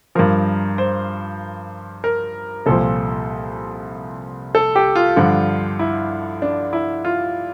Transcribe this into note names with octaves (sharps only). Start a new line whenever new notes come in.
G2 F3 A#4
C5
A#4
C2 A#2 F3 A4
A4
G4
F4
G2 D3 F3
E4
D4
E4
F4